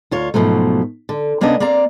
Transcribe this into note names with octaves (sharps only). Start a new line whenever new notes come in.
D2 F4 C#5
G#2 B2 F3 F#3 A3
D3
C3 A#3 B3 C#4 D4 D#5
A#3 C4 D5 A#5